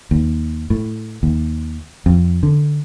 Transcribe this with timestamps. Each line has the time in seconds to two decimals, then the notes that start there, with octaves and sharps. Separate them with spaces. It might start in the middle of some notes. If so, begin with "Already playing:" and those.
0.11 D#2
0.70 A2
1.23 D#2
2.06 F2
2.43 D3